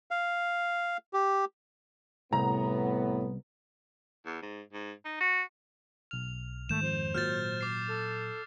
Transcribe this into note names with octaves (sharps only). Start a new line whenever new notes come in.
F5
G4
C2 A2 B3 A#5
E2
G#2
G#2
D#4
F#4
B1 F6 F7
G#2 D#3 G#3 A3 G6 E7
F2 C5
A#2 F#3 F6 G6 A6
D6 C7
A4